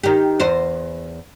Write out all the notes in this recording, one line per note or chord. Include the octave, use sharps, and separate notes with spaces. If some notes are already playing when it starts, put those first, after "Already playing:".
D#3 G4
E2 C5 D#5